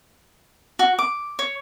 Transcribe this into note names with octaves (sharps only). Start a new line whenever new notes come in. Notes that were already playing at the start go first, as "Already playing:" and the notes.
F#4
D6
C#5